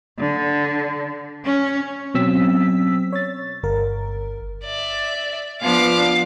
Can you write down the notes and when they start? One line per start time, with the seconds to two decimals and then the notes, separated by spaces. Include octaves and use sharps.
0.19 D3
1.45 C#4
2.14 B2 F#3 C4 C#4 E6 B6
3.13 C#5 A6
3.63 G1 A#4
4.65 D5 E5
5.62 F3 B3 D4 F5 D6